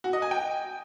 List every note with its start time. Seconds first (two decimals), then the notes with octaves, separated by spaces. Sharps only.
0.04 F#4
0.13 D#5
0.22 G#5
0.31 G5